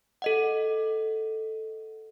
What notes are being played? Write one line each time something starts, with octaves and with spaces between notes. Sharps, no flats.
A4 D#5 F#5